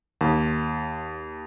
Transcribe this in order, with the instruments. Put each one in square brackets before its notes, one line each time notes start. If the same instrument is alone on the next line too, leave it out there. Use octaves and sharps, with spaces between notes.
[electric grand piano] D#2